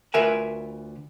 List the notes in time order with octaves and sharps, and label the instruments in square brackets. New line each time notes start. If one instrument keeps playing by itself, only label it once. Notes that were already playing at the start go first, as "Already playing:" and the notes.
[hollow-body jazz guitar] D2 F4 A#4 B4 E5 G#5